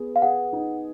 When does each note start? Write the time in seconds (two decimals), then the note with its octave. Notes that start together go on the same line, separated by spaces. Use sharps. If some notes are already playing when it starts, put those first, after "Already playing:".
Already playing: B3 G#4
0.16 F5
0.22 G#4 F#5
0.53 D#4